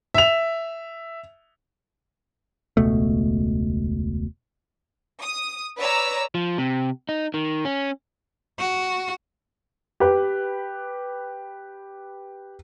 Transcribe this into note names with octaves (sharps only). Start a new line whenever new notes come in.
E5 F7
E1 C#2 B2 A3
D#6
B4 C#5 D5 A#5 E6
F3
C3
D#4
D#3
C#4
F#4
G4 B4